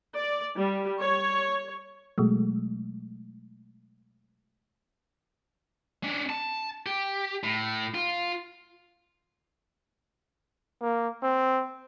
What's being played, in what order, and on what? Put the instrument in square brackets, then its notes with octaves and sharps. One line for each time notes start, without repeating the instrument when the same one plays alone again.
[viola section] D5
G3
C#5
[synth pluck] B2 F#3 G#3 A3
[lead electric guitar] C#4 D4
A5
G4
A2
F4
[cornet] A#3
C4